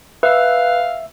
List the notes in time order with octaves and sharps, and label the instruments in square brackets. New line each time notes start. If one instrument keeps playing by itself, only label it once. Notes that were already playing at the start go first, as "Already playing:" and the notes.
[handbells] B4 [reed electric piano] E5 E6 [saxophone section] F5